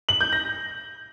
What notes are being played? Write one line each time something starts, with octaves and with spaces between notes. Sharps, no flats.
F#7
G6
A#6